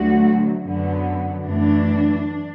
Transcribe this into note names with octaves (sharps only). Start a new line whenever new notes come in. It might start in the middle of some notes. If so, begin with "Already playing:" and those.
Already playing: D2 D3 F#3 A3 F#4
F#2 D3 F#3 B3
F#2 E3 A3 D4